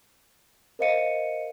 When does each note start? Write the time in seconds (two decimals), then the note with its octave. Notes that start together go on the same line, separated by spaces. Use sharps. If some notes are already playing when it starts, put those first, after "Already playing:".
0.79 A#4 C5 D#5 F5 C#7 D#7